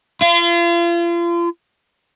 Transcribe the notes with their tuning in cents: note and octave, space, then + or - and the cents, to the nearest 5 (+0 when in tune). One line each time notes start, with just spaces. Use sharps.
F4 -35